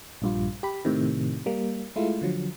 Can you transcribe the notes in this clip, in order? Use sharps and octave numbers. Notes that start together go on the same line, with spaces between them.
A#1 G2 F4
G4 B5
A2 C3 D#3
G3 A#3
G#3 A3 E4 F4
D3 F3 F#3